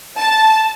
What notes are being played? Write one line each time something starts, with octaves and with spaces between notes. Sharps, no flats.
A5